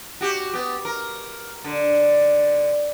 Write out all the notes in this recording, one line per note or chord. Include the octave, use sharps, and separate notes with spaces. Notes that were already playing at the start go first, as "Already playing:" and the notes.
F#4 G4
B3 G4
A#4
D3